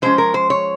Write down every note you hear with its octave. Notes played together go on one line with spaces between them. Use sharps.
F3 G#3 C#4 C5
A#4
C5
C#5